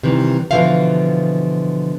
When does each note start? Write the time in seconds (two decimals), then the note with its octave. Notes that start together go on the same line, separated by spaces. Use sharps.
0.03 C3 D#3 E3 G3
0.51 B2 D3 E3 F3 E5 F5